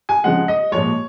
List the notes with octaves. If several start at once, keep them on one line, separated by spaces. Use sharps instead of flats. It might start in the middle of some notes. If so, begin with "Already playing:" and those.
G#5
C#3 F3 G#3 F#5
D#5
A#2 F3 G#3 C#5